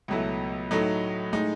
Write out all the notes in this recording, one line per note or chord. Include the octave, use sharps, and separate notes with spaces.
C#2 B2 F#3 A3 E4
A2 F#3 A3 D#4
A2 G#3 D#4